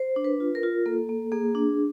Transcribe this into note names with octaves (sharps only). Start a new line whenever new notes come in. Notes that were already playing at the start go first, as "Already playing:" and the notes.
Already playing: C5
D4
B4
F4
A#4
F4
A#3 A4
A#3
A#3 G#4
D4